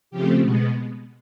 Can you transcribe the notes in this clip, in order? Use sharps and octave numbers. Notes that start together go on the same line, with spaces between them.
C#3 F3 A3 C4 G4
B2 G#3 B3